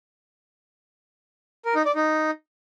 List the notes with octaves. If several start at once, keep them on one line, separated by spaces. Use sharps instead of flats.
A#4
D#4
D5
D#4